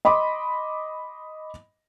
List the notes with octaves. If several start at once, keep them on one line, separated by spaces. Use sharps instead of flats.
D#5 B5 C6 D6